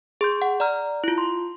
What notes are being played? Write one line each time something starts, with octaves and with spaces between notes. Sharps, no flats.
G#4 C6 G6
F#5
D5 A#5 F6
E4 F4
C6